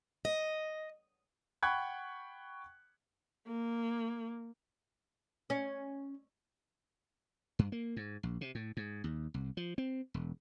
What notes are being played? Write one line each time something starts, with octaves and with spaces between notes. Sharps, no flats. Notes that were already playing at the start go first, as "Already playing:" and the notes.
D#5
F#5 G5 B5 C#6 F#6 G#6
A#3
C#4
G2
A#3
G#2
A#1
C3
A2
G#2
D#2
C2
F3
C4
E1